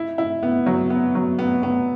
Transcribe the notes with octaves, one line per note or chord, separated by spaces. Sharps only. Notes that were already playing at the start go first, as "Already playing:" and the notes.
Already playing: E4
E4
B3
F#3
B3
F#3
B3
B3